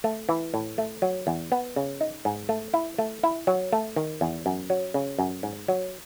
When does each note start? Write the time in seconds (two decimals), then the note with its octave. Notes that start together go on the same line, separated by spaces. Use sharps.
0.04 A3
0.29 E3
0.54 A2
0.78 A3
1.02 F#3
1.27 E2
1.52 B3
1.76 C#3
2.01 D#4
2.25 G#2
2.49 A3
2.74 E4
2.98 A3
3.23 E4
3.47 F#3
3.73 A3
3.96 D#3
4.21 E2
4.46 F#2
4.70 F#3
4.94 C#3
5.19 F#2
5.43 G#2
5.68 F#3